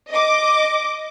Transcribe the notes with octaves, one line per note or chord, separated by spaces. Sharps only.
D#5 D6